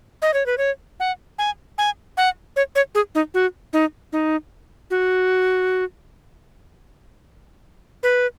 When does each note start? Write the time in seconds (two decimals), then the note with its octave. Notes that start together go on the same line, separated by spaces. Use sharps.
0.22 D#5
0.34 C#5
0.46 B4
0.58 C#5
1.00 F#5
1.39 G#5
1.78 G#5
2.17 F#5
2.56 C#5
2.75 C#5
2.95 G#4
3.15 D#4
3.34 F#4
3.73 D#4
4.13 D#4
4.90 F#4
8.03 B4